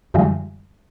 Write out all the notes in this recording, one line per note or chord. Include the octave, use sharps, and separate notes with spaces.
F#2 D3 E3 F3 G3 G#3